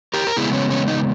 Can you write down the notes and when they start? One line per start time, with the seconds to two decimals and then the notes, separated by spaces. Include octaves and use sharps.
0.14 G4 A#4
0.27 A#4
0.36 E2 C#3 G#3 B3 E4 G#4
0.53 C#4
0.70 C#4
0.88 D#4